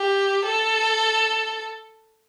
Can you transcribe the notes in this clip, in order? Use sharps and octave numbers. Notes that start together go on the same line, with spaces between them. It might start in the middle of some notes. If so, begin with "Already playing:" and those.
Already playing: G4
A4